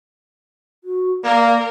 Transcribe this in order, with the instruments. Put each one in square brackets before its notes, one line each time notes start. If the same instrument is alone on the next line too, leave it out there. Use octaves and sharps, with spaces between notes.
[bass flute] F#4
[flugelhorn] A#3 [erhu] A#4 [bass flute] D5